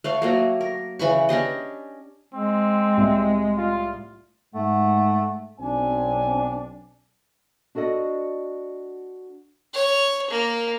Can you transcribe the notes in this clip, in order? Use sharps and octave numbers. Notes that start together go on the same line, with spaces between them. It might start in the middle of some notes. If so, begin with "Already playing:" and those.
A3 C#5 F5
F#3 A3 A#3
A#4
C#3 E3 B5 C#6
C#4 D4 G4 D#5
G#3 C4
C2 A2 E5
F4
G#2 A3 F#5
B1 C4 D4 G#5
D4 F#4 A4 D5 D#5
C#5
A#3